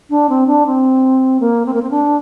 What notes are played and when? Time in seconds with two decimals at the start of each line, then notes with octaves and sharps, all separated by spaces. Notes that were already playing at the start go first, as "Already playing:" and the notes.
0.10 D4
0.29 C4
0.47 D4
0.67 C4
1.40 A#3
1.66 C4
1.74 A#3
1.82 C4
1.91 D4